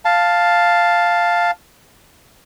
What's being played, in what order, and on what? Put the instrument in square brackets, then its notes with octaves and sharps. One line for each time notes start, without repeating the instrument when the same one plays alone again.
[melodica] F5 A5